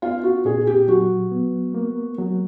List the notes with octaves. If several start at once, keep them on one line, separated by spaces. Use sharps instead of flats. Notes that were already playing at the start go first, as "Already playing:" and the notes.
B3 F4
F#4
A#2 G#4
G4
F#3 F#4
B3
A#3
F#3